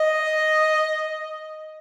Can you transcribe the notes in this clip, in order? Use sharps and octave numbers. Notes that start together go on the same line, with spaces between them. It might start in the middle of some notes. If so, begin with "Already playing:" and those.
Already playing: D#5